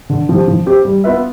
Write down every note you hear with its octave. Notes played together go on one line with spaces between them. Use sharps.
D3
F3 C4 G4
F3
C4 G4
G3
B3 F4 B4 E5